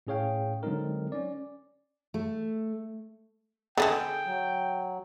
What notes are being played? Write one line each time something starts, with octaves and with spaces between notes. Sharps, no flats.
A2 C#4 G#4 C#5 F5 G5
D3 F#3 G#3 C4 D#4 A#4
C#4 D5
A3
D3 F3 B3 G#4 A4 G5 A5
F#3